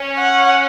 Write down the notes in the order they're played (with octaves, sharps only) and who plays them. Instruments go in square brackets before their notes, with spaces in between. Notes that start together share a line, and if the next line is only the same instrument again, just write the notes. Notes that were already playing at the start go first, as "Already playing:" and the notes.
Already playing: [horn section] C#4
[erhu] F#5